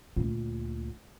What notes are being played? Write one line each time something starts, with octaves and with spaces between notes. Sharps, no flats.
D2 A#2